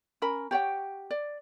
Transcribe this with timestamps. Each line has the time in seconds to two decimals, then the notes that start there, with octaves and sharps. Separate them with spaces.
0.22 C#4 A#4 B5
0.51 G4 C#5 F#5 G5
1.11 D5